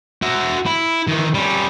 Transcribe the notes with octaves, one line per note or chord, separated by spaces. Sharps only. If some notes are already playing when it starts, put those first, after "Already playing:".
F#4 E5
E4
D#3 E3
G3 C#4